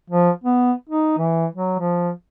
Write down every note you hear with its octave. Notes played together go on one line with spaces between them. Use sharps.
F3
B3
D#4
E3
F#3
F3